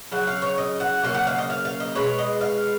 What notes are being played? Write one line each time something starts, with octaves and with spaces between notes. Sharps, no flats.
C#3 F#3 F#5
F5
C#5
D#5
F#5
C#3 F#3 A#3
F#5
F5
D#5
F5
F5
D#5
B2 G#3 B3 C#5
D#5
F5